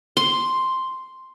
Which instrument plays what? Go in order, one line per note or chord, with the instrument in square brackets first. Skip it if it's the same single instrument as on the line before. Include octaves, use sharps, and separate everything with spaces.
[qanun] C6